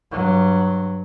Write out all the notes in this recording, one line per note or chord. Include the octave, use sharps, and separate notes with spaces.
G2 F#3